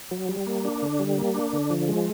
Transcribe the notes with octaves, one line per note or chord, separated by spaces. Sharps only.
F#3
G3
A#3
D4
D3
G3
A#3
D4
D3
F3
G#3